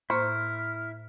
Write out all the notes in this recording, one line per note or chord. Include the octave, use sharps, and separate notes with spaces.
A2 A#3 E4 C5 F6